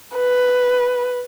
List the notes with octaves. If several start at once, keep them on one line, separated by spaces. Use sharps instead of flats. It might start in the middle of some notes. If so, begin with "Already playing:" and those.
B4